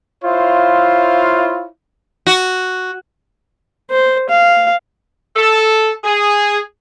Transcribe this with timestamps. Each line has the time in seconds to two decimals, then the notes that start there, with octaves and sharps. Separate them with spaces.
0.24 E4 F4 C5 C#5 E5 F5
2.27 F#4
3.91 C5
4.29 F5
5.36 A4
6.04 G#4